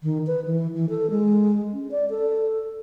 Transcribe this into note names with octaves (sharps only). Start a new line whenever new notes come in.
D#3
B4
E3
E3
A4
G#3
C#4
D5
A4